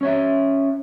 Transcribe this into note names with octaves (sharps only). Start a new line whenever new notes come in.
C#4 C#5 E5